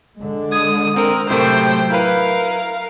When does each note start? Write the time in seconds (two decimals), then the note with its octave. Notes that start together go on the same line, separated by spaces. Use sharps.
0.18 D3 G#3
0.52 D#6 G#6
0.96 C4 A#4
1.29 A2 C3 F#3 A3 C5 G5
1.90 E4 A#4 B4 F5